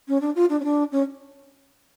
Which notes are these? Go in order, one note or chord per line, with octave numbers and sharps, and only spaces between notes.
C#4
D4
F4
D4
C#4
D4
C#4